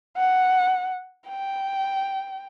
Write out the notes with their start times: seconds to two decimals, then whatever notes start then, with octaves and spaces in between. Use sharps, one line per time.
0.17 F#5
1.29 G5